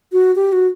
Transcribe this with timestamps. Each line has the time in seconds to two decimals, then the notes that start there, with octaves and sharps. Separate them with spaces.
0.12 F#4
0.36 G4
0.52 F#4